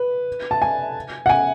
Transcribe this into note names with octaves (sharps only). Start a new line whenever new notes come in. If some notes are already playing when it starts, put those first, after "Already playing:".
Already playing: B4
A5
G#5
F#5
G#5